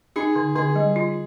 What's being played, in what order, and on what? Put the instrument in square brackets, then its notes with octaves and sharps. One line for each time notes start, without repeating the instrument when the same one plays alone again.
[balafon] D#4 [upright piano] G#4
[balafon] D3
[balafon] D3 [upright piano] G#4
[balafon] G3
F4